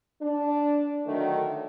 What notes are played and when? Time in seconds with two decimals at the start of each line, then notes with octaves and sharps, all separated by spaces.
0.21 D4
1.06 D3 D#3 F#3 A3